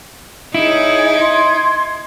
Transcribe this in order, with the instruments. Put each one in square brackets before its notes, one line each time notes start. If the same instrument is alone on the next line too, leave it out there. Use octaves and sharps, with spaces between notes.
[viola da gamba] D#4 [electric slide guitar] E4 [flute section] G#4 C#5
[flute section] C6 G#6